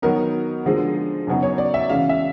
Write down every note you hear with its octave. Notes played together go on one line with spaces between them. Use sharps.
D#3 F#3 B3 D#4 A#4
D3 F3 G#3
F#2 C#3 F#3 B3 D#4
C#5
D5
E5
C#3 E3 G#3 F5
E5